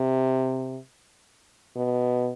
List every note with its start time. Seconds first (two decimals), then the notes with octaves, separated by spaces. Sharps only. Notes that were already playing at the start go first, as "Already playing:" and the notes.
Already playing: C3
1.76 B2